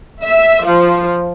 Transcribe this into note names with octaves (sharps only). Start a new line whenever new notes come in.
E5
F3